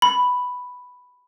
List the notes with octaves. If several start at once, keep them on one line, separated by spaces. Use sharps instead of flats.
B5